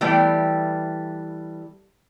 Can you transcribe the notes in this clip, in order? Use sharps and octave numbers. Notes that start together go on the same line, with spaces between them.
E3 G3 A3 D5 G5